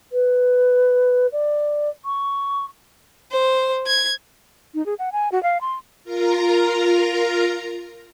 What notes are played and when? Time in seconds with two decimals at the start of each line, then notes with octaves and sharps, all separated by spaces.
0.12 B4
1.32 D5
2.05 C#6
3.31 C5
3.87 G#6
4.74 D#4
4.86 G#4
4.99 F#5
5.12 G#5
5.32 F#4
5.43 F5
5.61 C6
6.04 F4 A#4 A#5